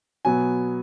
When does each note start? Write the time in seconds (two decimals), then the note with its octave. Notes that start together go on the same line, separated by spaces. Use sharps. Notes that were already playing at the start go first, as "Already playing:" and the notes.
0.25 B2 F#3 B3 G#5